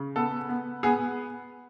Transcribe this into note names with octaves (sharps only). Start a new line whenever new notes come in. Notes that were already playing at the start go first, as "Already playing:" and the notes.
Already playing: C#3
B3 A4
B3
B3 G#4